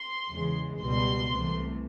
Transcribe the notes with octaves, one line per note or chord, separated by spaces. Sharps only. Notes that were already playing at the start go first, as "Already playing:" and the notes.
Already playing: C6
E2 C#3 E3 G#3
C#2 B2 G3 C6
C2 C3 E3 A3